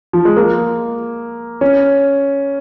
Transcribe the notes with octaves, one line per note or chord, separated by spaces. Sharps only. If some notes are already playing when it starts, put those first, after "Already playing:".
F3
G#3
A#3
C#4